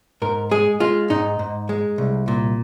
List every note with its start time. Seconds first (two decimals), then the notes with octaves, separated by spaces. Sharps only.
0.22 G#2 A#4
0.51 G#3 G#4
0.80 G#3 F4
1.10 G#2 D#4
1.39 G#2
1.69 G#3
1.98 C2
2.28 A#2